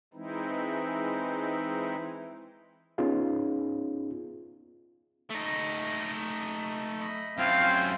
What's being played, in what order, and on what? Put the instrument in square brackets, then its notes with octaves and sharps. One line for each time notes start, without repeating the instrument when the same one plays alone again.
[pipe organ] E3 G#3 C4 D#4 E4
[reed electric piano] B3 C#4 D#4 F4 G#4
[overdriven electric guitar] A3 D#4
[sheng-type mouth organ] D#5 B5
[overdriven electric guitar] F#2 A3 [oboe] C4 [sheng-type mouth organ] E4 F4 [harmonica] F5
[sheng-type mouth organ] F4 C5 G#5